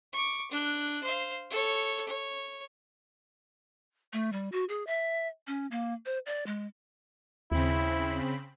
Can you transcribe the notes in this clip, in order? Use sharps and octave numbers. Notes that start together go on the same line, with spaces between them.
C#6 D6
D4 F#6
C5 F5
A4 C#5
C#5
A3
G3
F#4
G#4
E5
C#4
A#3
C5
D5
G#3
D#2 C#3 C4 E4 B5